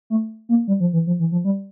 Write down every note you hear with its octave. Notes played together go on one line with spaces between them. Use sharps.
A3
A#3
G3
F3
E3
F3
E3
F3
G3